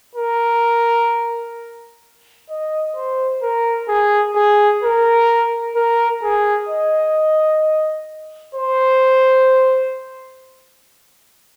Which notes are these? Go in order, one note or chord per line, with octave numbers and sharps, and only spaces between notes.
A#4
D#5
C5
A#4
G#4
G#4
A#4
A#4
G#4
D#5
C5